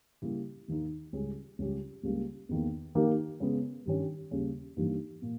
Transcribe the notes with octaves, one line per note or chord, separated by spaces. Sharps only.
C#3 G3 A#3 E4 G4
D#2 D#3 A#3 D#4
C#2 C#3 G3 C#4 G#4
C#2 C#3 G3 C#4 G4
C#2 C#3 G3 A#3
E2 D#3 A#3
D#3 A#3 D#4 G4 A#4
C#3 G#3 B3
G2 D#3 G3 C#4
D#2 C#3 G3 C#4
G2 E3 G3 A#3 D#4
A#2 A#3